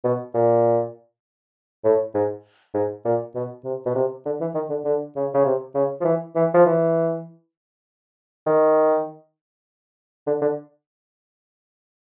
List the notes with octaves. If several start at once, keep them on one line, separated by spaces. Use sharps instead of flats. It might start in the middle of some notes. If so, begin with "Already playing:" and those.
B2
A#2
A2
G#2
G#2
A#2
B2
C3
B2
C3
D3
E3
D#3
D3
D3
C#3
C#3
C3
C#3
F3
E3
E3
F3
E3
D#3
D3
D3